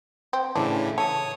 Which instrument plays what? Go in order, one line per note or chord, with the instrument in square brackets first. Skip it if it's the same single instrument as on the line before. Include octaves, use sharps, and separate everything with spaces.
[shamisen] C4
[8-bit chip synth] A2 C#3 E3 [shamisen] D4
[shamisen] A4 [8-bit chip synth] C#5 D#6